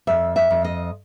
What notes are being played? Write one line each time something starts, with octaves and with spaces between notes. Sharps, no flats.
F2 E5
E5
F2
D#5